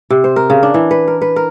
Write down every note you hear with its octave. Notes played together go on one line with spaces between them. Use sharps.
C3
C5
A#4
C#3
D4
E3
B4
A#4
B4
A#4